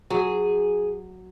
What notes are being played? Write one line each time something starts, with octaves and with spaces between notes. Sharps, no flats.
F#3 G#4